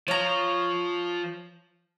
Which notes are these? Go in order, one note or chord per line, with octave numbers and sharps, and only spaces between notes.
F3 F4 C#5 A#5